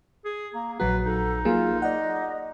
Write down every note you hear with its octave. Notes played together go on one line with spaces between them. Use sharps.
G#4
A#3 A#5
A#1 F#3 F#4 B4 A#5
D#4 A4
F#3 A#3 F4 G#4
D5 D#5 F#5